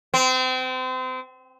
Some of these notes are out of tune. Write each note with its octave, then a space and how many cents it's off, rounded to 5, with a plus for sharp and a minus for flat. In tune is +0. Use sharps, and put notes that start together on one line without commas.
C4 -30